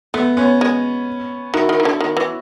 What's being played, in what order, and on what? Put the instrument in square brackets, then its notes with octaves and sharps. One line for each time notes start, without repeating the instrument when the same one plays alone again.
[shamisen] A3 [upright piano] B3
[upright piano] B3 C#4
[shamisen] G#3
[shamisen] D#3 [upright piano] E4 F#4
[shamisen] D#3
D#3
D3
D#3
E3